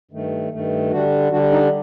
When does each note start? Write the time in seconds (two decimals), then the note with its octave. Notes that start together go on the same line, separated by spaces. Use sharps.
0.11 G2 D#3 A3
0.51 G2 D#3 A3
0.91 D3 G3 D4 F#4
1.31 D3 G3 D4 F#4
1.52 D#4